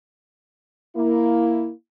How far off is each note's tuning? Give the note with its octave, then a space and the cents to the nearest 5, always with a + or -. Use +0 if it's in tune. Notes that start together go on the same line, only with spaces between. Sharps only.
A#3 +0 E4 +0